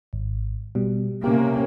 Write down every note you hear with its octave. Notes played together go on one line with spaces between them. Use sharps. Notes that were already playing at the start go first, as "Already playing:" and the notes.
G#1
B2 G3
C3 A#3 C#4 G4